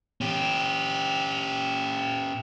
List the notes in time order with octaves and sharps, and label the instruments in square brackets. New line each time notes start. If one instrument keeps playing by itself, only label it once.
[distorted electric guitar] C#4 G4